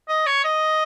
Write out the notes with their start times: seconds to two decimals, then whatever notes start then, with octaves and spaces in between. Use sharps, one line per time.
0.08 D#5
0.26 C#5
0.44 D#5